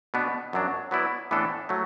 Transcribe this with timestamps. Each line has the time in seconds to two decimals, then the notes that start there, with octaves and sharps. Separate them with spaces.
0.14 B2 B3 D4
0.53 F#2 F#3 D4
0.91 F#3 B3 E4 D5
1.31 A2 E3 B3 D4 A4
1.69 F#3 A3